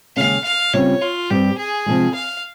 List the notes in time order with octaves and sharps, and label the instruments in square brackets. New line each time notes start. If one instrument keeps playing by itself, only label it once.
[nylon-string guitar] D#2 C#3 G#3 C#4 [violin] F5
[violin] F5
[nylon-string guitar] C#3 G3 C4 F4 [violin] C#5
[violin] F4
[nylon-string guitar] G2 G3 C4 [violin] G4
[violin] G#4
[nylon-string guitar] C3 F3 G#3
[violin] F5